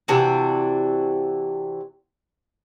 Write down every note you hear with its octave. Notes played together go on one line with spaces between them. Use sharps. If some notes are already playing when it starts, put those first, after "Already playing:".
C3 E3 D4 F#4